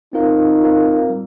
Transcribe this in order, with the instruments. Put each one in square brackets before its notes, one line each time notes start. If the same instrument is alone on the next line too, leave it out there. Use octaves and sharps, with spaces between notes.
[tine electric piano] C4 F4 A#4 F5 [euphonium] D#4
[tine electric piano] C4 F4 A#4 F5
G3